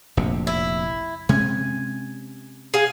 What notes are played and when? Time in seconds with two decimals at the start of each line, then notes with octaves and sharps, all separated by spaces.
0.17 F1 A#1 C3
0.47 E4
1.29 C3 G#3 C#4 G#5
2.74 G#4 F5